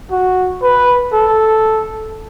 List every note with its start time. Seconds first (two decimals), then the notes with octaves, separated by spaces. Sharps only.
0.11 F#4
0.63 B4
1.13 A4